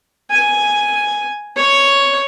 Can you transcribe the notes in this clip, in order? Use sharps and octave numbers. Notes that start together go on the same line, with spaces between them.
G#5
C#5